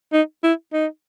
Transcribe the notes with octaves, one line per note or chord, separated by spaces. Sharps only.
D#4
E4
D#4